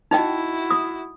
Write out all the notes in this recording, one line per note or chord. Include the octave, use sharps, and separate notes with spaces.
D#4 E4 F#4 D#5 G5
D#6